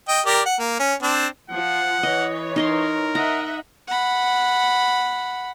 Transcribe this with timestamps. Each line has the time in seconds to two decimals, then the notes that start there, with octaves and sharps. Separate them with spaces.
0.08 D#5 G5
0.26 G4 A#4 D5
0.46 F#5
0.59 A#3
0.79 C#4
1.03 C4 D4
1.50 F3 F#5
2.03 E3 C#5 D#5
2.56 D#4 A#4 D#5 C6
3.15 D#5 E5 F#5 A#5
3.87 F#5 B5